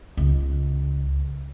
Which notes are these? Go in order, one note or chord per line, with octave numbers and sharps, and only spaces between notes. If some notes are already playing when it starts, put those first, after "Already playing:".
C#2